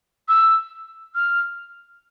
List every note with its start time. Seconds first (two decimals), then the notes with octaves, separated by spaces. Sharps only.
0.28 E6
1.15 F6